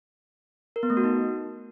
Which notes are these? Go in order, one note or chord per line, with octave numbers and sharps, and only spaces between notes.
A#4
B3
A3
F#4
D#4